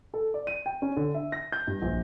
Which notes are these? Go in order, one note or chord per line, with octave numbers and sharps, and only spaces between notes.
A4
D5
D#7
G5
C#4
D3
E5
A#6
G6
G2
A#1